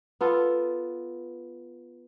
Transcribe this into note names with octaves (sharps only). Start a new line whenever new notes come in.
B3 F4 A4 B4